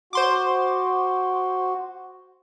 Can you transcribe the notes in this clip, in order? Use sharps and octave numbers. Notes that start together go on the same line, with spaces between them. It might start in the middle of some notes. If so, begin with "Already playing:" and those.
F#4 C5 C6 D6